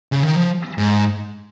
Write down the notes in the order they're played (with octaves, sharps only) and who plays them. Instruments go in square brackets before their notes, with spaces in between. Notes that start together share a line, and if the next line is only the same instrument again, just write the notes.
[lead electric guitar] C#3
D#3
F3
G#2